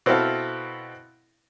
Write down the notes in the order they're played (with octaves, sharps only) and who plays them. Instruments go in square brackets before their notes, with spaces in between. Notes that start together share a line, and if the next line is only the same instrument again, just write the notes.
[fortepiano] B2 C4 E4 A4 F5